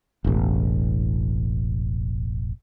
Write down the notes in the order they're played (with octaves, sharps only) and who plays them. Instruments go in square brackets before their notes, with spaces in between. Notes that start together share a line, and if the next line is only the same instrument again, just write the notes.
[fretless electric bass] E1 A1